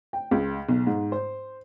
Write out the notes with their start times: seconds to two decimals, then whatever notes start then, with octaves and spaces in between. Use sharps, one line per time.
0.13 G5
0.31 C#2
0.69 B1
0.87 G#2
1.12 C5